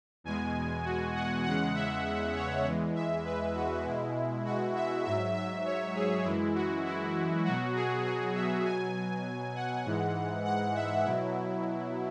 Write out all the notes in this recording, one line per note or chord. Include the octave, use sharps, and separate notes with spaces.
E2 B2 G#3 G#5
F#4
F#5
E2 C#3 G#3 F#5
E5
C#5
E2 E3 G#3
E5
B4
F#4
B2 G#3 E4
F#4
E5
G#2 F#3 E5
E5
C#5
G#4
F#2 E3 G#3 E4
F#4
E4
B2 F#3 F#4
G#4
G#4
E5
B2 F#3 G#5
F#5
G#2 E3 G#3
F#5
E5
B2 F#3 E4